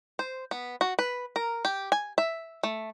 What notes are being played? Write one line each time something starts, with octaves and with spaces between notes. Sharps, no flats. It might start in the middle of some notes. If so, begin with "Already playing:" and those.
C5
B3
F#4
B4
A#4
G4
G#5
E5
A3